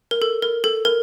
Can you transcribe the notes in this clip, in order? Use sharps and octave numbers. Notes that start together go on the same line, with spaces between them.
A#4
A4
A#4
A4
A#4